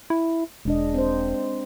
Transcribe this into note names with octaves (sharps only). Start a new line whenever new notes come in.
E4
E1 G#3 D4 D#5
C4 C5